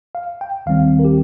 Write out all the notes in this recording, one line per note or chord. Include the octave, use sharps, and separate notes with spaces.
F5
G5
D#2 D#3 G3 C4 F5
A#4
G4